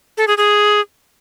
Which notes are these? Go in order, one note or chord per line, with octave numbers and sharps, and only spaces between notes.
A4
G#4
G#4